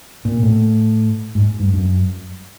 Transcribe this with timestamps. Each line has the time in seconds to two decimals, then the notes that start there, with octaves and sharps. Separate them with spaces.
0.25 A#2
0.43 A2
1.35 G#2
1.60 G2
1.73 F#2